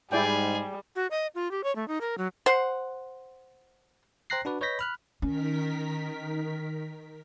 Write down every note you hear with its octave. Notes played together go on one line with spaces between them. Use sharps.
G#2 G3 E4 G#4 D5 G5
F#4
D#5
F4
G4
C#5
A3
D#4
A#4
F#3
C5 F#5
C5 G5 A#5 F#6 A#6 C7
D4 F#4 B4 D5
B4 C#5 D#5 G6 A#6 B6
B5 F6 F#6
D#3 C#4 A#4 B6